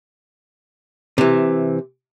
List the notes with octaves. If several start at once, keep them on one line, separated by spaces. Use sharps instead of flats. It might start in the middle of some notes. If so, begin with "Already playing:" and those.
C3 E3